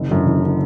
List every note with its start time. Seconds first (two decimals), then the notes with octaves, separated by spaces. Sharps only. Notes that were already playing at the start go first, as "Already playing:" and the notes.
Already playing: F#1
0.09 F#2 D3
0.26 F#1
0.44 D3